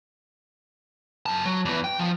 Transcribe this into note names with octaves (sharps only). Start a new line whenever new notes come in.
F#2 A5
F#3
E2 E3
G5
F3